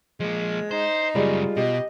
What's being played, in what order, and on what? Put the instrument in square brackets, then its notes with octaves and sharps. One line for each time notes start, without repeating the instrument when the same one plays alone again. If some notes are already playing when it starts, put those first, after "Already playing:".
[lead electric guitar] F3 A#3 [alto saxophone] G#3
[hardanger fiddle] D#4 [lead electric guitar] C5
[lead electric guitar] F#2 C#3 [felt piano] G3 G#3 D5 [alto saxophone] F4
[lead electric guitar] B2 [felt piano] G4 [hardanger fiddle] D#5